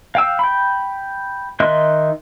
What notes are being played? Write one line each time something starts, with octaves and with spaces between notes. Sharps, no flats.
F5 G5 E6
G5 B5
D#3 D#5 E5 C6 F#6